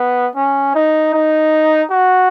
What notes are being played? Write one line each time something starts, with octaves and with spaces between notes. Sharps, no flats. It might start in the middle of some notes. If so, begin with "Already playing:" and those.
Already playing: B3
C#4
D#4
D#4
F#4